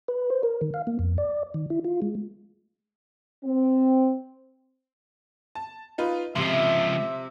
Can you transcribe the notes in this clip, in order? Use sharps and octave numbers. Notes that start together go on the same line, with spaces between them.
B4
C5
A#4
D#3
F5
A#3
F2
D5
D#3
E4
F4
G#3
C4
A5
D#4 F4 B4
C#2 C3 F3 E5 C6